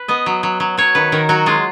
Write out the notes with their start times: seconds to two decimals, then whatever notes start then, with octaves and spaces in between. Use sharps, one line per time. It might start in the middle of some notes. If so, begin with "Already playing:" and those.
Already playing: B4
0.08 B3 D#5
0.26 F#3
0.43 F#3
0.60 F#3
0.77 F#3 C#5
0.95 D#3 B4
1.12 D#3 A#4
1.29 F#3 F#4
1.46 G#3 F4